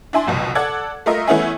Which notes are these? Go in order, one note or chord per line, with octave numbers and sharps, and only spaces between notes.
D4 E4 G#5 C6
F#1 C2 F2 B2
A4 D5 F#5 G#6
A3 F4 A#4 D#5 E5
E3 A3 B3 C#4 E4 G#4